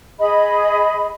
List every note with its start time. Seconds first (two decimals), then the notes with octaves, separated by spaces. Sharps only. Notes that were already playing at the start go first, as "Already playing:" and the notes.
0.19 G#4 D#5 B5